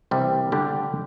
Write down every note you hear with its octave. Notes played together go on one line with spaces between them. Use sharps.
C2 C3 E3 G3 C4
D3 G3 D4 G4